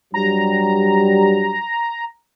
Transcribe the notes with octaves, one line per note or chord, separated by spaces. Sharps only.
G2 F#3 G3 A#5